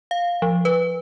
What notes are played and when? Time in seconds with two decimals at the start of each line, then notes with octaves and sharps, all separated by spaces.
0.11 F5
0.42 F3
0.65 B4